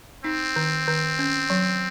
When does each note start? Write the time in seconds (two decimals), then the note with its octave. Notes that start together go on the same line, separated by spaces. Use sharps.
0.24 C4 D#4
0.56 D#3
0.88 D#3
1.19 C#4
1.50 F#3